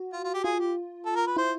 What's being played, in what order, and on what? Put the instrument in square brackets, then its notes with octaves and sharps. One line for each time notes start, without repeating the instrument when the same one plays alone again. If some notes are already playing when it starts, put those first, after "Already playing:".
Already playing: [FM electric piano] F#4
[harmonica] F4
F4
G4
[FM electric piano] F4 [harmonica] G#4
[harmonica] G4
A4
A#4
B4
[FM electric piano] E4 [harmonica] C5